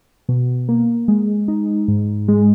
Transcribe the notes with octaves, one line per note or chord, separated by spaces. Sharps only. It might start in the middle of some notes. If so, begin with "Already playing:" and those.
B2
A#3
G#3
D#4
G#2
G#3